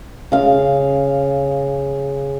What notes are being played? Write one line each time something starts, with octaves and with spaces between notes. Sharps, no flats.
C#3 F5